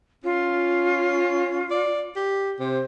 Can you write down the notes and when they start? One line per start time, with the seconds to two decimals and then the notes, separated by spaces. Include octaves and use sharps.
0.24 C#4 F4
1.71 D5
2.16 G4
2.60 C3 C5